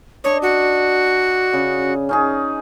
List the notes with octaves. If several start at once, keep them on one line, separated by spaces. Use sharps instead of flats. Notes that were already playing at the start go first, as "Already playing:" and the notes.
D4 C#5 D#5
F#4
C#3
C#4 D#4 G#4